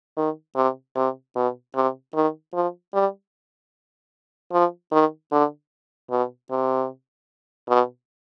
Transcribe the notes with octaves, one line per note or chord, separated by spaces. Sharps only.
D#3
C3
C3
B2
C3
D#3
F3
G3
F3
D#3
D3
B2
C3
B2